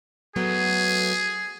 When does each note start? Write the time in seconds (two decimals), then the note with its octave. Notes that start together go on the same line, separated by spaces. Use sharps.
0.36 F#3 A3 B3 G#4